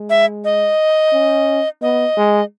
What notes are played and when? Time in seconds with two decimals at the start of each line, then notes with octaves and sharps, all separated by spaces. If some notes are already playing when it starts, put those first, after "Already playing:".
Already playing: G#3
0.10 E5
0.45 D#5
1.13 C#4
1.82 B3 D#5
2.17 G#3